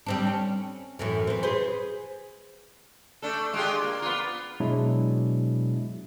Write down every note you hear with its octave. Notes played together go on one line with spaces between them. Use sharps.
G3 C4 D4
C#4
F#2 A2 E3
E3 C4
G#4 B4 C5
A3 D4 A4
G#3 F4 G4
A#3
B3 F4
B2 F#3 G#3 D4 E4